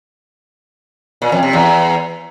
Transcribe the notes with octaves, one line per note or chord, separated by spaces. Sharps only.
A#2
F2
C3
E2